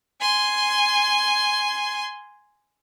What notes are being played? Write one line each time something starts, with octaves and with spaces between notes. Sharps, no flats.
G#5 C6